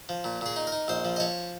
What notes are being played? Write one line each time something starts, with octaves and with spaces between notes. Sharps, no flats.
F3
A#2
A#2 G#4
D#4
A#4
D#4
A#1 C5
F3
D#5
F3 C#5